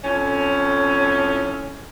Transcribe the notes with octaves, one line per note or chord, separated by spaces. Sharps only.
F2 A2 C#4